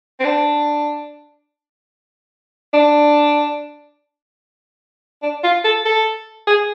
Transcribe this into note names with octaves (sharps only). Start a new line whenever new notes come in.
C4
D4
D4
D4
F4
A4
A4
G#4